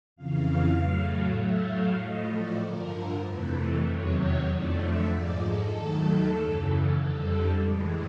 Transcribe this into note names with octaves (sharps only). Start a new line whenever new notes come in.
F2 C#3 E3 F5
A2 F#3 A3
A2 F#3 A3 E5
F5
A2 F3 A3 D#5
D5
G2 D3 F3 A#4
F2 C3 E3 A3 B4
E2 C3 D#3 F#3 C#5
C#5
F2 D3 F3 A3 D5
E5
G#2 F3 G#3 D5
A4
D#2 D#3 F#3 A3
F#2 C#3 E3
F2 D3 G3 A4
A2 E3 G#3